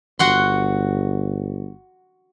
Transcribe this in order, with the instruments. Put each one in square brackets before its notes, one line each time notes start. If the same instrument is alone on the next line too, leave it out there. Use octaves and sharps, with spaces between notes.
[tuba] G1 [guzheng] F#4 F#5 C6